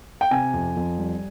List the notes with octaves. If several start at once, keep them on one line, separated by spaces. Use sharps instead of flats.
G5
C3 G#5
F2
F2
G3